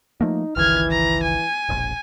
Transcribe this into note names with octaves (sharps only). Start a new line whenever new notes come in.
F3 A3 A#3 D#4
G1 C#2 D#3 E3 F6 G#6
A#5
G#5
E1 A#1